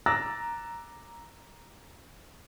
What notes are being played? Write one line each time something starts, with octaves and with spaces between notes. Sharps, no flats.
A#5 D6 E6 F#6 A6 A#6